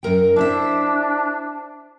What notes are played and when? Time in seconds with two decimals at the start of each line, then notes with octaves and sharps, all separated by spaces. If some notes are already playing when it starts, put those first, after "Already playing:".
0.03 F#2 A#4 G5
0.36 D4 E4 C5 E5